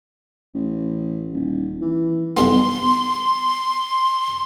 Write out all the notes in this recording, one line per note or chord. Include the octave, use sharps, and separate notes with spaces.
A1
D#1
E3
B1 G2 B3 C6